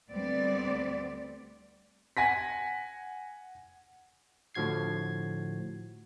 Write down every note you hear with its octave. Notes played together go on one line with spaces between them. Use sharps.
D2 G3 B3 C4 D5
F#5 G#5 A#6 B6
A2 D3 F3 F#4 G#6 C7